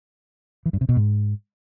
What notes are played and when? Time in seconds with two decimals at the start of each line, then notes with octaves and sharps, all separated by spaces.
0.66 E3
0.73 G2
0.81 C3
0.89 B2
0.96 G#2